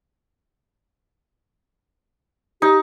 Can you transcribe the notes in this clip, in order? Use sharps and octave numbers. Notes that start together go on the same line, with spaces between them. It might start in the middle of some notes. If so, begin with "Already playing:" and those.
D#4 G4